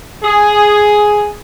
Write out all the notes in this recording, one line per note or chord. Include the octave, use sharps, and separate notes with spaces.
G#4